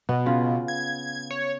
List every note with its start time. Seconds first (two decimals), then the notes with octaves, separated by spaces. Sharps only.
0.09 B2 B3
0.26 C#3 F4
0.68 G#6
1.31 C#5